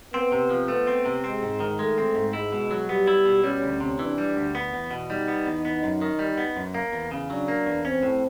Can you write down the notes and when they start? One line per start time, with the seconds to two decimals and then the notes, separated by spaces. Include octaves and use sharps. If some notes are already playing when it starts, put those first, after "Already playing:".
0.14 B3 C4
0.32 C3
0.50 F3
0.68 A3 B3
0.87 C4
1.05 C3
1.24 G#3 C4
1.42 G#2
1.60 D#3
1.79 G#3 A3
1.98 C4
2.15 G#2
2.33 G#3 E4
2.52 B2
2.71 F#3
2.89 G3 B3
3.07 E4
3.25 B2
3.44 G3 C#4
3.62 D2
3.80 C3
3.99 E3 D4
4.18 G3
4.36 D2
4.55 B3
4.73 E2
4.91 B2
5.10 G3 D#4
5.28 B3
5.46 E2
5.65 B3
5.83 F#2
6.01 D#3
6.19 G3
6.38 B3
6.56 F#2
6.74 A#3
6.92 E2
7.11 C#3
7.30 F#3 D4
7.48 A#3
7.66 E2
7.84 C4 C#4
8.03 A2